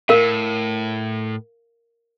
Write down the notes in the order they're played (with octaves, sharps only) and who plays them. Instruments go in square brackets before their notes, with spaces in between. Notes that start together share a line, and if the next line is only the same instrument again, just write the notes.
[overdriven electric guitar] A2 [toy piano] A#4 F5